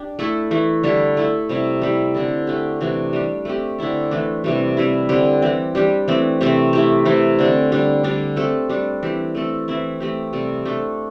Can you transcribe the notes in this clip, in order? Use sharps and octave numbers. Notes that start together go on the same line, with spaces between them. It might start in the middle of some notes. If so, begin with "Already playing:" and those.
Already playing: D4 G4
A3 E4 A4
E3 A3 E4
D3 G3 E4 A4
A3 E4 A4
C3 G3 E4
G3 E4 G4
D3 C4 E4 A4
A3 D4 G4
C3 E3 A3 D4
G3 D4 G4
A3 C4 G4
D3 C4 E4 A4
E3 A3 D4
C3 E3 G3
G3 C4 E4
D3 C4 G4
E3 C4 G4
G3 D4 G4
E3 A3 C4
C3 E3 A3 C4
A3 E4 G4
C3 E3 A3 E4
D3 C4 A4
D3 G3 D4
D3 G3 D4 G4
A3 C4 A4
G3 D4 A4
E3 C4 G4
A3 C4 A4
E3 C4 E4
A3 C4 G4
C3 G3 C4 A4
A3 D4 A4